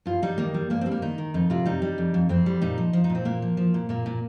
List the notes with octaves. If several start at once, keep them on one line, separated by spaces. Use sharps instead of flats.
G2 F4
G3 D#4
D#3 A#3
G3
G2 A#3
G3 C4
A#3
D#3 D#4
D#3
F2 D#4
C3 F4
G3 D#4
G3
F2
F2
F2 C4
G3
A#2 D#4
F3
F3
D#4
A#2
C4
A#2 A#3
F3
F3
A#2
A#2 A#3
A#2